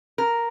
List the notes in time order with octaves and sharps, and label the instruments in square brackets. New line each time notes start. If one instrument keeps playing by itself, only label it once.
[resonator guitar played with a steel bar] A#4